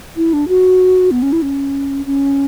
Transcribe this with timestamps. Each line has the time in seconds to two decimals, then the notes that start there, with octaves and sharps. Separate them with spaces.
0.17 E4
0.33 D4
0.48 F#4
1.11 B3
1.22 C#4
1.33 E4
1.42 C#4
2.06 C#4